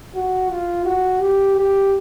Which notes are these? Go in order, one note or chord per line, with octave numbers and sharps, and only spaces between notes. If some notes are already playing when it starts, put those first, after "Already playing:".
F#4
F4
F#4
G4
G4